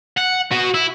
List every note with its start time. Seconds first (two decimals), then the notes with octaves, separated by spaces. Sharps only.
0.18 F#5
0.51 B3 F#4
0.74 E4